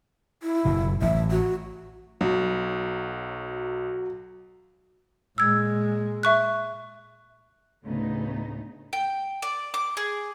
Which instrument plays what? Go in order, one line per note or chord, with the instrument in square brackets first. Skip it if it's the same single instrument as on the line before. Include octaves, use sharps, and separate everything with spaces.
[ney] E4
[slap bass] F#1 B2
[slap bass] A1 [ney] E5
[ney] F#4
[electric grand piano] B1 [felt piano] F#3
[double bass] A#2 G#3 [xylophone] E6 G#6
[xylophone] E5 C#6 F#6
[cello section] D2 A2 C#3 A3 B3 D#4
[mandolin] G5
D5
D6
G#4